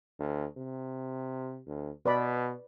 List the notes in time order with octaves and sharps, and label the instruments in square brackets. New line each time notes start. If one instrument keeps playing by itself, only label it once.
[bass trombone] D2
C3
D2
[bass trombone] B2 [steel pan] B4 D5 B5